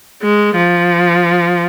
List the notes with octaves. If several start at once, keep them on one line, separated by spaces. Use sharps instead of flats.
G#3
F3